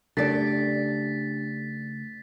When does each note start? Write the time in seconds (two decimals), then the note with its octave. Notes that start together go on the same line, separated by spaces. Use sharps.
0.17 C#3 A3 D4 G4 A4 D5 A6 B6